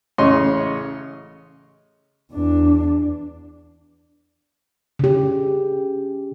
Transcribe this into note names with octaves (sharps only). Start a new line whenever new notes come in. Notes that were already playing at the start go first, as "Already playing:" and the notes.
A1 C#3 C#5 D#5 C6
E2 D4
C#3 G4